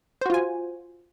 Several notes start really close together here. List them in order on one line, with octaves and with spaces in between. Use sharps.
C5 F#4 F4 G#5